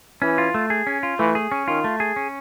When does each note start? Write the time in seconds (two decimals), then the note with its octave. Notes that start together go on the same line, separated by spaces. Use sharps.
0.22 E3 C#4
0.38 F4
0.54 A3
0.70 G#4
0.87 C#4
1.03 F4
1.19 E3 A3
1.35 G#4
1.52 C#4
1.68 D#3 F4
1.84 A3
2.00 G#4
2.16 C#4